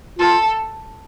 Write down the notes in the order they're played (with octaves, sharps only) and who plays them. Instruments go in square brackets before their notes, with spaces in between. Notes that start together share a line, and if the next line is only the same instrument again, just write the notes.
[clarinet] F4 [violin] A4